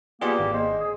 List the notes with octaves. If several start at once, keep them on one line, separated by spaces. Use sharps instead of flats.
G3 A#3 B3 F4 G#4
G#1
G#3 C5
G#4